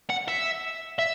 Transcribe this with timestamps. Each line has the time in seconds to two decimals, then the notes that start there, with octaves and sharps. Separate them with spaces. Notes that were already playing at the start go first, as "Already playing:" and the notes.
0.10 F#5
0.28 E5
0.99 E5